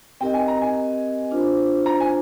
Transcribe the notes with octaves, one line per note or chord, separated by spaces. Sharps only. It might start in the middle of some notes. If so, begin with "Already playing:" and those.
C4 G4 A#4 D#5 G5
G#5
A#5
G#5
D4 F4 C5
A#5
G#5